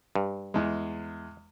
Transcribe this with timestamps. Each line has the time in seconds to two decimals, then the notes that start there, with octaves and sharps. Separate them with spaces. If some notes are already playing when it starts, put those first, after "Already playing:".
0.15 G2
0.54 E2 G#3